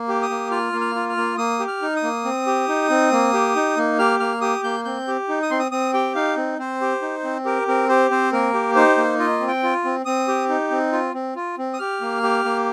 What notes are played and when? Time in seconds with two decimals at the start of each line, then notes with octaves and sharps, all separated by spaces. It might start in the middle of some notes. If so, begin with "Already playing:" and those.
Already playing: A#3
0.08 G4
0.22 D#6
0.30 A#3
0.51 F4 F6
0.73 A#3
0.81 F6
0.95 F4
1.09 F6
1.17 A#3
1.38 A#3 D#6
1.60 G4
1.68 F6
1.82 D#4
1.96 D#6
2.03 A#3
2.25 C4
2.47 G4
2.68 D#4
2.90 C4
3.12 A#3
3.33 G4
3.56 D#4
3.77 A#3
3.99 G4 F6
4.20 A#3 F6
4.41 G4 D#6
4.64 A#3 G6
4.85 C4 G6
5.08 G4
5.29 D#4
5.43 D#6
5.51 C4 C6
5.59 D#6
5.72 C4 D#6
5.93 G4 G5
6.15 D#4 F5
6.37 C4
6.59 C4 C5
6.81 G4
7.02 D#4
7.24 C4
7.45 G4 A#4
7.68 C4 A#4
7.89 G4 C5
8.11 C4 C5
8.32 A#3 A#4
8.54 G4
8.75 D#4 C5
8.97 A#3
9.19 F4 D#5
9.40 C4
9.48 G5
9.63 F4
9.85 C4
10.05 C4 D#6
10.28 G4
10.49 D#4
10.71 C4
10.92 F4
11.14 C4
11.36 F4
11.58 C4
11.73 D#6
11.79 G4 F6
12.01 A#3
12.23 G4
12.45 A#3